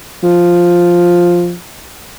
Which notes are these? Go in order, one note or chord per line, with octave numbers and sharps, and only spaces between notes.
F3